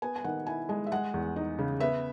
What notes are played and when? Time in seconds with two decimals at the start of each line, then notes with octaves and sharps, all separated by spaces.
0.02 B3 G#5
0.16 G#5
0.24 D#3 F#5
0.47 E4 G#5
0.69 G#3 G#5
0.86 E5
0.92 G#3 F#5
1.14 E2
1.36 D#4
1.59 C#3
1.80 B3 E5